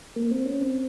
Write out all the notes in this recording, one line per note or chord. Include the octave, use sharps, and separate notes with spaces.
A#3
C4
C#4
C4